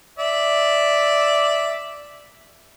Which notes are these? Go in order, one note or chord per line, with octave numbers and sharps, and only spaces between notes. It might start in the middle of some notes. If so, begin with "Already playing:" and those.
D5 E5